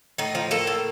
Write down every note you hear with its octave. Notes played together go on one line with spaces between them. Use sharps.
A2 D#4
F3
A#3 A4
A2